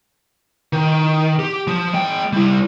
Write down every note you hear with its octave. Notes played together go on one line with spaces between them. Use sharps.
D#3
G4
F3
G#3 G5
G3 E4